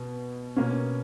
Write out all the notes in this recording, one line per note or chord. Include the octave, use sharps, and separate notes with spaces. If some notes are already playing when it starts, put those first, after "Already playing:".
Already playing: B2
B2 A#3 C#4